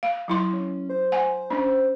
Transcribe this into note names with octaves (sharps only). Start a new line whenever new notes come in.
F5
F#3 E4 C6
C#4
C5
F#5 G#5
C#4 D4